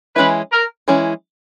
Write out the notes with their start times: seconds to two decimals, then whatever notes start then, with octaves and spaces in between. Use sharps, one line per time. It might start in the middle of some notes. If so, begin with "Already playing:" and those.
0.16 E3 G#3 C#4 E4 B4
0.52 A#4
0.88 E3 G#3 C#4 E4